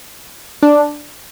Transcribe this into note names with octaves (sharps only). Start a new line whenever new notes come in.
D4